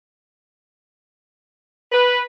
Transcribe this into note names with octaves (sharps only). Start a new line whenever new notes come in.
B4